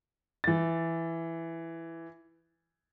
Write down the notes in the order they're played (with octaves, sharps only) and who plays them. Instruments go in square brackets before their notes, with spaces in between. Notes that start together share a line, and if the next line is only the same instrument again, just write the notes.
[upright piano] E3 A6